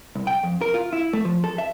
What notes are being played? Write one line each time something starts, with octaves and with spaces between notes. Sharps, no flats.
C2
G5
F2
A#4
F4
E4
A3
F3
A4
E5